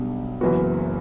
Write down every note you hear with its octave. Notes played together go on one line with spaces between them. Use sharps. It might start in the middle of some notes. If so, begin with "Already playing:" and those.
Already playing: B1 B2 G3 D4
F#1 F#2 E3 B3 F#4